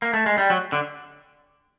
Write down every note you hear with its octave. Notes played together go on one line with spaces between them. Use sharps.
A#3
A3
G#3
G3
F#3
D3